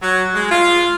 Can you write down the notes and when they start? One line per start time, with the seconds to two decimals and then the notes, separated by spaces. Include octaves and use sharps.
0.02 F#3
0.35 G#3
0.51 F4